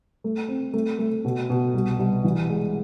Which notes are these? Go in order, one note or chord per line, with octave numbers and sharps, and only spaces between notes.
A3
C4
A3
A3
B2
B2
C2
C2
E3
G#3